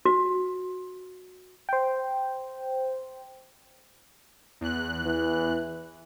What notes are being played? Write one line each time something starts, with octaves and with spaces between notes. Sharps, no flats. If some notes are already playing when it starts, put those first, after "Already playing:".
F#4
C5 G5
E2 F#6
E3